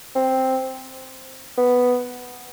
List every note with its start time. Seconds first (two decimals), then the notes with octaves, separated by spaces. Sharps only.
0.15 C4
1.58 B3